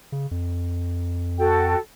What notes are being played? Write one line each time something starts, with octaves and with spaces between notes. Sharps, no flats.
C#3
F2
F#4 A4 G5